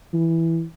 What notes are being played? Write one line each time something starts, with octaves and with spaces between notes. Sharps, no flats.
E3